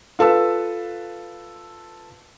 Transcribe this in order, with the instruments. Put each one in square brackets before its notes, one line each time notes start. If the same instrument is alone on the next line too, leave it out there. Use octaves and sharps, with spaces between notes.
[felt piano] F4 A4 B4 E6